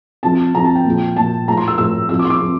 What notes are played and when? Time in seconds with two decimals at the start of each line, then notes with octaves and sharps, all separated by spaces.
0.23 C3 F3 A5
0.54 C3 F3 A#5
0.65 A5
0.75 G5
0.85 A#2 F3
1.16 A#2 F3 A5
1.47 A2 F3 A#5
1.57 C6
1.68 E6
1.78 A2 F3 E6
2.09 C3 F3 E6
2.19 D6
2.25 C6
2.30 D6
2.40 C3 F3